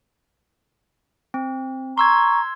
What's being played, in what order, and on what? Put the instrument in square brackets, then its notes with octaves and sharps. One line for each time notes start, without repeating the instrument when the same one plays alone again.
[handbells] C4
[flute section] A#5 C#6 [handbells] C6 E6 G#6